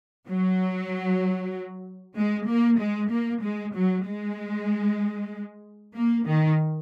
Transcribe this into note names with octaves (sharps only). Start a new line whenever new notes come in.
F#3
G#3
A#3
G#3
A#3
G#3
F#3
G#3
A#3
D#3